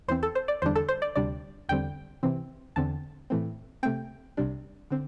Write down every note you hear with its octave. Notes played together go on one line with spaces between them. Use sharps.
E2 E3 C4 C5
A4
C5
D5
E2 D3 G3 D4 C5
A4
C5
D5
D2 C3 G3 D4 D5
E2 D3 G3 C4 G5
C3 E3 C4
E2 D3 C4 A5
A2 E3 A3 C4
C3 A3 C4 G5
C2 C3 G3 D4
D3 C4